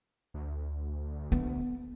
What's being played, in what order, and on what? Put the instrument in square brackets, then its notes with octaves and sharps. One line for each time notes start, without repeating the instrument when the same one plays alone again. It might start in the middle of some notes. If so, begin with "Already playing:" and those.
[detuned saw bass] D2
[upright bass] B3